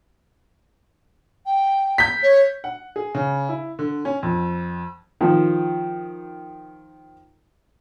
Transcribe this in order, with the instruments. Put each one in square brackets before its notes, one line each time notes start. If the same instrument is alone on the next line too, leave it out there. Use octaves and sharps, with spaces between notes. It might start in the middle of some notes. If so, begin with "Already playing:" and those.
[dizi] G5
[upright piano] G6 B6
[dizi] C#5
[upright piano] F#5
G#4
C#3
E4
D3
C#4
F2
[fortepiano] D#3 F3